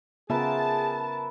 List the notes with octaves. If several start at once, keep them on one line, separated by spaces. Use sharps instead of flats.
C#3 B3 F4 G#4 A#4 B4 E5 A5